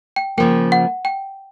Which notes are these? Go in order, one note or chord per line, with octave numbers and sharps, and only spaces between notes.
G5
C#3 F3 A#3 G5
F#5
G5